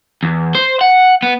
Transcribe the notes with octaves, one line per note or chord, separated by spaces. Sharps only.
E2
C5
F#5
B3